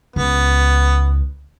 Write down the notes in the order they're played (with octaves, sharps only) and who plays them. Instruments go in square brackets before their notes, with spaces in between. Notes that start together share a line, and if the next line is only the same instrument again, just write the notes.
[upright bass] C#2 [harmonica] B3